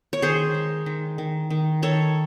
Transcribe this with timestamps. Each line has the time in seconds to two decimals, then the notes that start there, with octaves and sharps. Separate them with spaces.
0.13 C#5
0.22 D#3 G#4 C5
0.54 G#3
0.86 D#3
1.18 D#3
1.50 D#3
1.82 D#3 A4 C#5